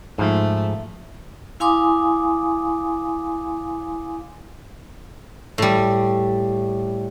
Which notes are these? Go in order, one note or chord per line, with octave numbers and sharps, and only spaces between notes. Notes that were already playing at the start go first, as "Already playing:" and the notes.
G#2 F3 A3
E4 F5 G#5 C6 D6 D#6
A2 G3